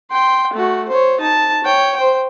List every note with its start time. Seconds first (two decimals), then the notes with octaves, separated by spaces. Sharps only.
0.10 G5 C6
0.53 A3 F#4
0.88 C5 C#5
1.20 D#4 A5
1.64 C#5 G5
1.96 C5 G5